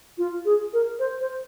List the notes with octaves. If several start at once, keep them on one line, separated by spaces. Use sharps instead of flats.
F4
G#4
A#4
C5
C5